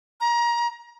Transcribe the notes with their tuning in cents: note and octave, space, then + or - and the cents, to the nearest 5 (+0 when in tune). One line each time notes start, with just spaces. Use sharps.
A#5 +25